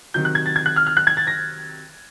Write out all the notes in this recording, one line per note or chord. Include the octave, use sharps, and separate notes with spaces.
C3 D#3 F#3 G6
F#6
G#6
A6
G#6
F#6
F6
F6
F#6
G#6
A6
A#6